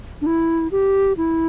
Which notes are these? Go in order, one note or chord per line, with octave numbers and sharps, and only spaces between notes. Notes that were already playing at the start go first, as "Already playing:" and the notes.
D4
E4
G4
E4